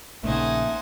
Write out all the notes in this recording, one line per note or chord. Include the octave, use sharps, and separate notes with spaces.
A#1 C#3 A3 A#3 D#4 C5 F#5 G#5